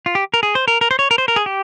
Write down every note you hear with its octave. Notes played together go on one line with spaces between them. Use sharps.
F4
G4
A#4
G#4
C5
A#4
A#4
C5
C#5
A#4
C5
A#4
G#4
G4